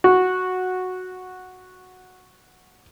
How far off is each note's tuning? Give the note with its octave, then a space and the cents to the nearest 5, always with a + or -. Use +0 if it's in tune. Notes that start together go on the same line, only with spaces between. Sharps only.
F#4 -5